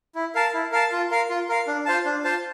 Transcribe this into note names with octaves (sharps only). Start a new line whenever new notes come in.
E4
A#4 F5 A5
E4
A#4 F5 A5
F4
A#4 F5
F4
A#4 F5
D4
F4 C5 F5 A5
D4
F4 C5 F5 A5